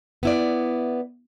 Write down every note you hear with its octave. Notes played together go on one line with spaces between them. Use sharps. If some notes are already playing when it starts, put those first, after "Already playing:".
B3 E4 D5